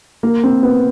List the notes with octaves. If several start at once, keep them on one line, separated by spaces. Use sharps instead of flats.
A#3
C4
B3